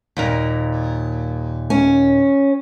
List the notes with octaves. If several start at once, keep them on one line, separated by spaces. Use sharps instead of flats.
D#2 A#2 A#4
C#4